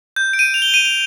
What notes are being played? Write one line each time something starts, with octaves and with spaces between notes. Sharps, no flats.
G6
D7
D#7
F7
G7
D#7
F7